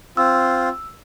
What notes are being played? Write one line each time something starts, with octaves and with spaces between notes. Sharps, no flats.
C4 F4 E6